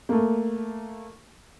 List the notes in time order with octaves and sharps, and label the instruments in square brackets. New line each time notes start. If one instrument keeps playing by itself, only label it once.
[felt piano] A3 A#3